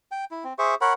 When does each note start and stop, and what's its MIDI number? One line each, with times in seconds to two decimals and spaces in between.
0.11 0.25 79
0.31 0.44 64
0.44 0.53 60
0.58 0.75 68
0.58 0.75 72
0.58 0.75 76
0.58 0.75 85
0.81 0.93 70
0.81 0.93 73
0.81 0.93 78
0.81 0.93 83